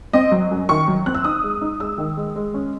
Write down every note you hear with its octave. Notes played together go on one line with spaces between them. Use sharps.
C4 D#5
F#3
F#2
D#3 C#6
F#3
C4 F#6
E6
D#4 D#6
G#3
D#4
G#3 E6
D#3
G#3
G#3
C#4